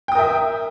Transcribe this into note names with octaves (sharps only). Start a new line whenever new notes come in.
A#4 E5 G5 D#6